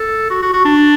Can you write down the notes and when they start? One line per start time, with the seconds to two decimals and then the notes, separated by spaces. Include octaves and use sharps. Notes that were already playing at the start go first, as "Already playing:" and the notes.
Already playing: A4
0.30 F#4
0.42 F#4
0.53 F#4
0.65 D4